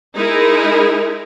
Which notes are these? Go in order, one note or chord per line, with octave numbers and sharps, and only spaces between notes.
G#3 D#4 E4 G#4 A#4